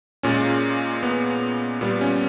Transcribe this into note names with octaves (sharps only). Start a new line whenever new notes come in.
A#2 G#3 C#4
B3
A#2 G3 B3
C#4